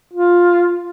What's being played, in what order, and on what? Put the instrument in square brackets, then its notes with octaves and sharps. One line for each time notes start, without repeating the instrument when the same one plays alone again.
[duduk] F4